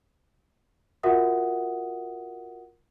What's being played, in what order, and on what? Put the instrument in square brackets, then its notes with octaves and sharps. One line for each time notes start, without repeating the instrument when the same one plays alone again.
[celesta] F4 F#4 A#4 E5 F#5 D#6